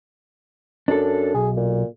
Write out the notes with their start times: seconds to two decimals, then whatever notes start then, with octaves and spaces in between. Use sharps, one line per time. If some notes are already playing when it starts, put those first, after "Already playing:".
0.88 F#2 D4 A4
1.34 B1 G#4
1.57 A#2